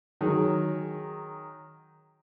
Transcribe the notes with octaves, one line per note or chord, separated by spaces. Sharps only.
D#3 F#3 G#4